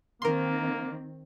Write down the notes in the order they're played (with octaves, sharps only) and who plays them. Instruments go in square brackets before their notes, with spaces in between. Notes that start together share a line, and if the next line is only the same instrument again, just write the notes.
[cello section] D#3 C4 [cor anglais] A#3 [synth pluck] A#4 C6